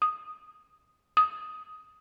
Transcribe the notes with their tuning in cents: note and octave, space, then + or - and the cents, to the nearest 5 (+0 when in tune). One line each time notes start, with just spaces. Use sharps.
D#6 -5
D#6 +10